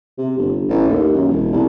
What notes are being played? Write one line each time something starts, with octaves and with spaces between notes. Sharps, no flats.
C3
G1
A1
D#2
F#2
E1
C2